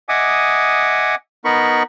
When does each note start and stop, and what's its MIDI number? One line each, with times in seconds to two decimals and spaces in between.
0.09 1.15 75
0.09 1.15 76
0.09 1.15 78
0.09 1.15 80
0.09 1.15 86
0.09 1.15 87
1.45 1.83 59
1.45 1.83 63
1.45 1.83 70
1.45 1.83 83
1.45 1.83 85